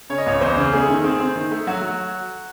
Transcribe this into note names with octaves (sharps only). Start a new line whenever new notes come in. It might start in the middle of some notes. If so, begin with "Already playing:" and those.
C#3 C#5
D#5
C#2 C#5
E2 C5
C#3
A3 G#4
D#3
C4 G#4
C4
D#3
A3
F#3 F#4
F#3